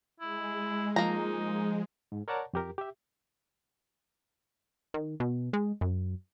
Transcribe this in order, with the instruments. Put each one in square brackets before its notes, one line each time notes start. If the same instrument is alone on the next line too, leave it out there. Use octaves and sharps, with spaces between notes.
[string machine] G#3 [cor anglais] E4
[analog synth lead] F3 [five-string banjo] A#3 A#5 [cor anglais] D#4
[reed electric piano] G#2
A#4 C#5 D5 F#5 A5 A#5
F2 G4 A#4
G4 E5
[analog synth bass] D#3
B2
G#3
F#2